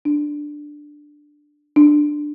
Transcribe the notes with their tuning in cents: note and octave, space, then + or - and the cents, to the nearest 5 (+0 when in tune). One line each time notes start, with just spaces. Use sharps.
D4 +5
D4 +10